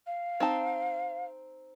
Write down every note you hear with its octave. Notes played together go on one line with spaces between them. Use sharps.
F5
C4 D#4 A5